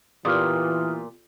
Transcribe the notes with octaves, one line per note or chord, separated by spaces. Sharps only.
A#2 E3 B3 F4 G4 D#6 F6